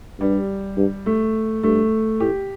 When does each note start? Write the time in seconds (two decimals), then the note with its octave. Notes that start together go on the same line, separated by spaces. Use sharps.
0.20 G2 G3
0.77 G2
1.06 A3
1.63 G2 A3
2.20 A2 G4